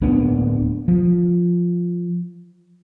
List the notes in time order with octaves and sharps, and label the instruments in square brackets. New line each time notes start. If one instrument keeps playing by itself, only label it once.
[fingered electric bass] D1 A#3 B3 D4
F3